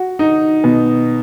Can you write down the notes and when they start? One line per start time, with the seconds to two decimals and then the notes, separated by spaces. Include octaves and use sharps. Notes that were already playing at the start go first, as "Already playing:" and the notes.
Already playing: F#4
0.19 D#4
0.64 B2